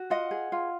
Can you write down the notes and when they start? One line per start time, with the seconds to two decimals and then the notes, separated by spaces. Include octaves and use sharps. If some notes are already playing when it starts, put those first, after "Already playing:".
Already playing: F#4
0.10 F4 D#5 F#5
0.31 G#4
0.52 F4